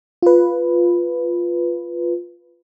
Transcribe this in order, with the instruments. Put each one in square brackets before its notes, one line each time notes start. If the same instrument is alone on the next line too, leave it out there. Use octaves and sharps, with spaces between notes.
[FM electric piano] F4 B4